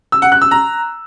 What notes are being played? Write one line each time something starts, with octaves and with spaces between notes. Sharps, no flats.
E6
F#5
F#6
E6
A#5